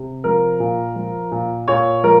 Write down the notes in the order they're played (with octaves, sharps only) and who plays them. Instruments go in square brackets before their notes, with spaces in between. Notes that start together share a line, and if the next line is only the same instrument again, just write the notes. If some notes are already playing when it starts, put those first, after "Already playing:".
Already playing: [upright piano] C3
F3 A#4
A#2
F3
A#2
A#2 C#5
F3 A#4